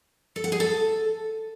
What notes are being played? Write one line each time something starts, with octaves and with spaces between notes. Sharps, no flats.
A4
F#5
G#4
A4